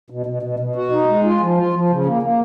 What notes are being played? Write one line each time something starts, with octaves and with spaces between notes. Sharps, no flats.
B2
B2
B2
B2
F#4
D#4
G#3
F4
F3
F4
F3
C#3
A#3
A#3